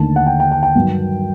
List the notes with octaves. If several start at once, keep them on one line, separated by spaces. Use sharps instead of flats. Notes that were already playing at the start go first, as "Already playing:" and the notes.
Already playing: D#2 D3 A3 D#4 A5
F#5
G5
G5
G5
G5
G2 D#3 F#3